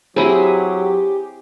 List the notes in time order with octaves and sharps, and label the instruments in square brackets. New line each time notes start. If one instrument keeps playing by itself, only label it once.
[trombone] F#3 [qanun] C4 E4 D#5 [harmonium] G4 [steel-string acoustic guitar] G#4